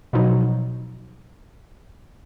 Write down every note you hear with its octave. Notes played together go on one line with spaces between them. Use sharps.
B2 F3 F#3 D#4